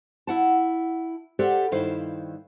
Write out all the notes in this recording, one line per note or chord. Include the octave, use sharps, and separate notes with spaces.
E4 F#5 A5
G4 A4 C5 D5 E5 F#5
G2 D#3 E4 C5 F5